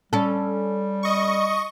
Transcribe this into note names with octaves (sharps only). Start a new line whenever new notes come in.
G3 C#4 A4
D#5 C#6